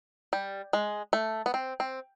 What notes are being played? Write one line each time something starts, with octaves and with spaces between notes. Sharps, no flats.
G3
G#3
A3
B3
C4
C4